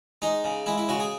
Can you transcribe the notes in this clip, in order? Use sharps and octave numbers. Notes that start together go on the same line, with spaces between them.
G#3 D#4
C#3
G#3 E4
E4
C#3 F#4
G#4